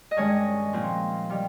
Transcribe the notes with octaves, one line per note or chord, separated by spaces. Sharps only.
D#5
G2 D#3 G#3 C#4 C#5
A#2 F3 C4
D#3 G3